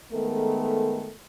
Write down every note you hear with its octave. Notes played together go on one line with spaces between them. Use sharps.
D#3 G#3 A3 B3 A4 A#4